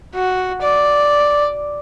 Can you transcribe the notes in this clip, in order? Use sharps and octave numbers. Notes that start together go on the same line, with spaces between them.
F#4
D5